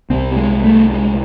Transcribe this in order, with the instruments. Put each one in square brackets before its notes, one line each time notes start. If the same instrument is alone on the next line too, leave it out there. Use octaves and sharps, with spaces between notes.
[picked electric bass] C2 C3 C4
G#3
A3
G#3